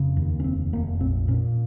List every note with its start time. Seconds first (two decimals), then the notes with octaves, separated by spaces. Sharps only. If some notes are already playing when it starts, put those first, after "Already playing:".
Already playing: F1 C#3
0.17 D#2
0.40 C#4
0.44 F1 C4
0.73 F1 A#3
1.00 A#1 C4
1.28 A#2 C#4